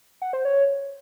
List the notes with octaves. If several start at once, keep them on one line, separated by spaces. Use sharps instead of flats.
F#5
C5
C#5